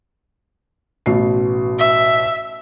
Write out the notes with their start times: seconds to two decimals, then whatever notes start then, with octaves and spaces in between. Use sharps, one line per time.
1.06 A1 B2 C7
1.79 E5